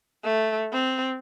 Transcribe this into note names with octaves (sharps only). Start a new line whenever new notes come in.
A3
C4